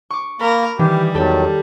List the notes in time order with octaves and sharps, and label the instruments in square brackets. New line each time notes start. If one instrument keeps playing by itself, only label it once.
[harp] C#6 D6
[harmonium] A#3 [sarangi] A#4 [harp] B5
[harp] D#3 [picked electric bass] E3 [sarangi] G3 [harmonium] G4
[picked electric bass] E2 [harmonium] D#3 F#3 [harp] G4 A4